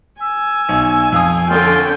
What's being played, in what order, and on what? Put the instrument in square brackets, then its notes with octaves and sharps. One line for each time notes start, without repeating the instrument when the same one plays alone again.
[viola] G#5 [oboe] E6
[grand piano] B1
F2 F5 D#6
[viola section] D3 C#4 G5 [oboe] F4